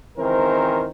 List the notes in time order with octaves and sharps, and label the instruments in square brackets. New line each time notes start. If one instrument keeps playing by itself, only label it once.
[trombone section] C#2 D#3 E3 C4 A#4 C5